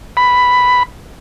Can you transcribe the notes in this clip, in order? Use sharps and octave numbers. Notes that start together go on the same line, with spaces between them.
B5